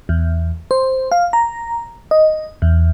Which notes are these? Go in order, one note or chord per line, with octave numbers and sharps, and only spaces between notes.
E2
C5
F5
A#5
D#5
E2